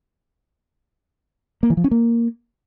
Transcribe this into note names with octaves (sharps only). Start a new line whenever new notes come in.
A#3
E3
F3
C#4
A#3